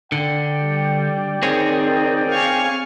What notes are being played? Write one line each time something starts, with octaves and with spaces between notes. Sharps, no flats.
D3 D5 G5
G3
D#3 C4 G#4 C#5
F5 G#5 C#6